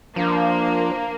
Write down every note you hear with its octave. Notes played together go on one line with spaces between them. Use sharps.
F3 A#3 D4